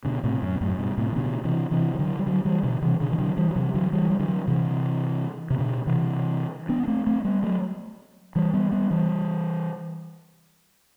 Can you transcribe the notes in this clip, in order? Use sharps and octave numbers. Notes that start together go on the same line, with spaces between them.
B2 D3
A2 C3
F#2
B2
F#2 A2
G2 B2
A2 C3
E3
B2 D3
C3 E3
C3 E3
E3
D3 F#3
G3
D3 F#3
E3 G3
B2 D3
C3 E3
B2 D3
E3
D3 F#3
E3 G3
F#3
C3 E3
D3 F#3
E3 G3
G3
D3 F#3
C3 E3
C3
B2 D3
C3 E3
B3 D4
D4
A3 C4
A3 C4
G3 B3
F#3 A3
E3 G3
G3 B3
G3 B3
E3 G3